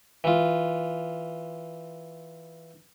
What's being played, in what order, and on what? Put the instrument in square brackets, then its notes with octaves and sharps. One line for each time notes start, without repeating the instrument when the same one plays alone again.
[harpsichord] E3 F4